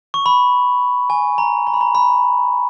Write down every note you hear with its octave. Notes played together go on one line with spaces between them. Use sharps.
C#6
B5
G#5
A#5
A#5
B5
A#5
B5